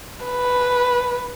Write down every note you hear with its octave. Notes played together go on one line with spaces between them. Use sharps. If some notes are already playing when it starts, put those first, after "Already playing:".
B4